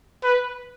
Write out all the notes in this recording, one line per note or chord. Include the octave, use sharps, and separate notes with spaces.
B4